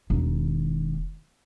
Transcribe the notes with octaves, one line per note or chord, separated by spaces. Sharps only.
E1 D#3